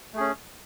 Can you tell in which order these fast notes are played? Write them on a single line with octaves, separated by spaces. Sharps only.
A3 G#4 C#4